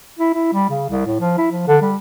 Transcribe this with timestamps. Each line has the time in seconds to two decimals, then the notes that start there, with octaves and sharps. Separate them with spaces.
0.19 E4
0.34 E4
0.53 G3
0.70 C#3
0.90 C2
1.06 A2
1.20 F3
1.38 E4
1.52 F3
1.68 D3
1.81 G3